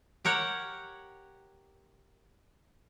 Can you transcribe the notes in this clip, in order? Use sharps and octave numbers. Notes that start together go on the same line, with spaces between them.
G4 A#4 C#5 F#5